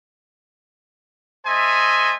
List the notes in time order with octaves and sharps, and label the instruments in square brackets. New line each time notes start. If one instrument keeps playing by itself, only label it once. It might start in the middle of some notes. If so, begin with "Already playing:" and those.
[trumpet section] A3 C5 D#5 E5 G#5